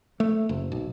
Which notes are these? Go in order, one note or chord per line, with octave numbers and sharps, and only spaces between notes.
A3
F#1
B1